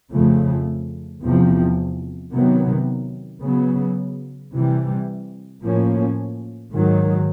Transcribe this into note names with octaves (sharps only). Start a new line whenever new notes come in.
F2 C#3 F3 A3
E2 C3 F3
C3 D#3 F#3 B3
C#3 F#3 B3
C3 E3 G3
A2 F3 A#3 C#4
G#2 D#3 F#3